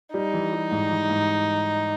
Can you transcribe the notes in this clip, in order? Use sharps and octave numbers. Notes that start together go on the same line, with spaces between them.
G3 D#4
E3
G3
G#2
E3
G#2